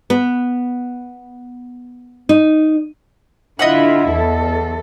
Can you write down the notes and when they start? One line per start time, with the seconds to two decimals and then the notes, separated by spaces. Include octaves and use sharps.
0.10 B3
2.29 D#4
3.59 D3 E4 F4 D#5 E5 F#5
4.11 E2 A4